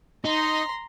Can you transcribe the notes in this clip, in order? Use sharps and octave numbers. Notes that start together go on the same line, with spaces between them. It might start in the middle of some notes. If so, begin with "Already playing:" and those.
D#4 A#5 C6